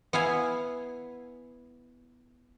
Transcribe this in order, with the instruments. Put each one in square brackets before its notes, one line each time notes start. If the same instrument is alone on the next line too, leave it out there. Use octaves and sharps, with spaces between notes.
[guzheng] B3 E4 F5 G#5